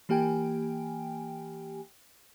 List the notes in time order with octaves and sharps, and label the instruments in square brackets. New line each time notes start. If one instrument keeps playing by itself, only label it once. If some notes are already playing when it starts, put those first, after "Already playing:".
[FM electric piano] E3 A#3 G4 G5 G#5